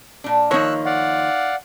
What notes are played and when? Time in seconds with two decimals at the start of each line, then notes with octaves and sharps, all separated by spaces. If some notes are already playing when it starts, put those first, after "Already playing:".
0.24 A#2 D4
0.51 D#3 F3 A#3 D#4 C#5 E6 F#6
0.86 D5 F5 F#5